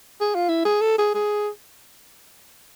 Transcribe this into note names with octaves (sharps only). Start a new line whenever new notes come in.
G#4
F4
E4
G#4
A4
G#4
G#4